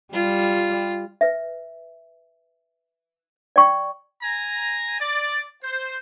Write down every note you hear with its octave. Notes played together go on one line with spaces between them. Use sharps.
G3 F4
B4 E5
D5 G5 C#6
G#5 A#5
D5
C5